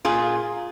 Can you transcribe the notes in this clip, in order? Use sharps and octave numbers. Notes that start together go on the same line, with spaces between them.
A#2 F4 G#4